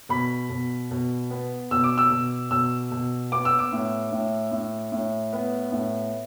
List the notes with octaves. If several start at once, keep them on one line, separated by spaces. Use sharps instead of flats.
B2 B5
B2
B2
B3
B2 E6
D6
E6
B2
B2 E6
B2
B3 D6
E6
D6
A2
A2
A2
A2
B3
A2